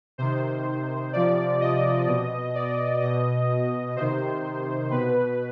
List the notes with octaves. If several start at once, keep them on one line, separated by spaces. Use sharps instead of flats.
C3 D#3 C5
C3 F3 D5
D#5
B2
D5
B2 D#5
C3 D#3 C5
B2 B4